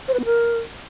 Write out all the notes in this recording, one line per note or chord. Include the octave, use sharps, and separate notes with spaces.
C5
B4
B3
A#4